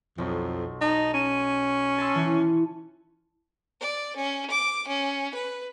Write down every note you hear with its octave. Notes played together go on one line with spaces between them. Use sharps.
B1 F2
D#4 A5
C#4 D#7 E7
A5 C6 E6
E3
D5
C#4
D6
C#4
B4